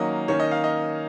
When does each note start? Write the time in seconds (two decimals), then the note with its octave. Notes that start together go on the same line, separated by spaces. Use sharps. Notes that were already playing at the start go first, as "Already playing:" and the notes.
Already playing: D#3 F#3 A#3 C#4 D#5 F5
0.28 D#3 A#3 C#4 C#5
0.40 D#5
0.51 F5
0.64 D#5